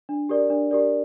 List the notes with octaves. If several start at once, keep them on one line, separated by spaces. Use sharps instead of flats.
D4
G4 A#4 D5
D4
G4 A#4 D5